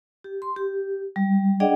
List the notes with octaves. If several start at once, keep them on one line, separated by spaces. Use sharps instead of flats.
G4
C6
G4
G3
D4 G#4 D5 D#5 F#5 G5